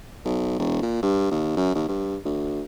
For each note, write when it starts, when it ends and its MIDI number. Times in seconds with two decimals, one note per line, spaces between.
0.25 0.59 35
0.59 0.81 28
0.82 0.99 46
1.03 1.30 43
1.31 1.54 39
1.57 1.75 42
1.75 1.87 39
1.88 2.17 43
2.25 2.62 38